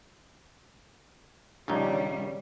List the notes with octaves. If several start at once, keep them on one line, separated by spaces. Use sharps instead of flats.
A#1 D#2 C#3 G3 C#4 D#4